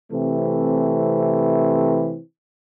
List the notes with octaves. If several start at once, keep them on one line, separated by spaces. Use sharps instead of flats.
C3 E3 A3 C4